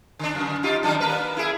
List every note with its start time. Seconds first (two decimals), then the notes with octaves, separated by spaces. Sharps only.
0.19 D3 D4
0.35 F#2
0.63 D#4 F4 G4
0.83 D#3 F#3 D4
1.00 A#3 A#4 B4
1.37 E4 G#4